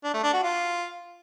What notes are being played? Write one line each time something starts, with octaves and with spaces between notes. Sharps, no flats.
D4
A3
D4
F#4
F4